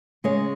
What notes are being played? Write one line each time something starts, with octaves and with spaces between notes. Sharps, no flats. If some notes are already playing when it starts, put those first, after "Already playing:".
C#3 G#3 C#5